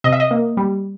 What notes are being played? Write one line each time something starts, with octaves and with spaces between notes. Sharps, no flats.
C3 D#5
E5
D#5
A#3
G3